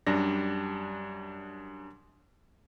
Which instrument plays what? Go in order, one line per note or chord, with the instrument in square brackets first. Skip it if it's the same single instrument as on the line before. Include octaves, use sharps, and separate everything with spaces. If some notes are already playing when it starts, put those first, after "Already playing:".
[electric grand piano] F#2 G3 D4 A#6